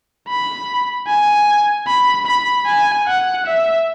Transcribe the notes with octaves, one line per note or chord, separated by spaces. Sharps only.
B5
G#5
B5
B5
G#5
F#5
E5